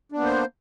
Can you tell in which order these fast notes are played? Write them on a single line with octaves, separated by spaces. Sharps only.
D4 B3 A#3 C5